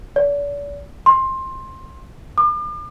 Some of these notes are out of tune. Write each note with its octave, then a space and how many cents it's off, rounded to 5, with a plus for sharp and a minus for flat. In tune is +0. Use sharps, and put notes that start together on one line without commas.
D5 -40
C6 +15
D6 +40